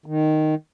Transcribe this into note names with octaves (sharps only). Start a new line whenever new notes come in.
D#3